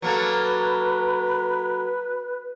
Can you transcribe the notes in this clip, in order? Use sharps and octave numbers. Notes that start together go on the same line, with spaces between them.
F#3 A#3 A4 B4